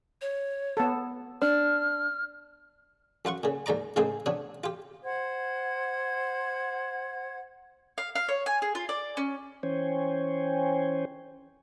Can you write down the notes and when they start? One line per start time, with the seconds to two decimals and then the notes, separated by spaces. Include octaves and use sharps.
0.21 C#5
0.77 B3 A4
1.42 D4 F6
3.25 F#2 F4 F#5 C#6
3.43 A#2 C#3
3.66 D#2 G#2 D5 A#5 D6
3.96 A2 C#3 A#3 C4 D#4 G#4
4.26 C3 B3 D4 C#5
4.64 F4 G4
5.04 C5 F#5 G#6
7.98 F5
8.15 F5
8.28 C#5
8.46 G#5
8.62 G#4
8.75 F4
8.89 D5
9.17 C#4
9.63 E3 C#4 C5 C#5 G5 G#5